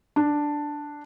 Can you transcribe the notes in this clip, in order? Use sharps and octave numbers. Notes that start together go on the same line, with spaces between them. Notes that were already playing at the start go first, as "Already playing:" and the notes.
D4